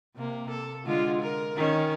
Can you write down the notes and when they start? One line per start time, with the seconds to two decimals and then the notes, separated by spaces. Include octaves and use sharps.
0.16 C3 A#3
0.50 A4
0.85 D3 G#3 F4
1.22 A#4
1.56 D#3 C#4